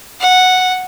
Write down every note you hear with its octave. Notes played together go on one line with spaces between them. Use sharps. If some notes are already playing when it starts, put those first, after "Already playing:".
F#5